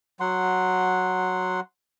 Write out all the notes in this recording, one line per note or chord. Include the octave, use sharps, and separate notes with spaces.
F#3 F#5 C6